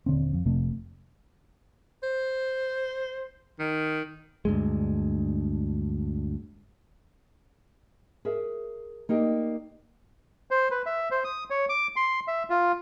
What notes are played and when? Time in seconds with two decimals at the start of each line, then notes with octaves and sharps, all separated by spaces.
0.06 D#1 D3 C4
0.33 F2
0.46 F1 C3 A3
2.03 C5
3.59 D#3
4.45 D2 G2 G#3
8.25 G#4 A#4 E5
9.09 A#3 D#4 G4 D5
10.51 C5
10.71 B4
10.86 E5
11.11 C5
11.24 D#6
11.50 C#5
11.69 D6
11.96 C6
12.28 E5
12.50 F4